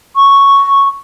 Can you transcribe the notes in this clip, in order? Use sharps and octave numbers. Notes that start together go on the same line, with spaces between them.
C#6